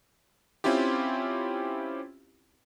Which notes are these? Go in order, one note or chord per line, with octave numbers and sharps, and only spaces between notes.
C4 C#4 E4 F4 G4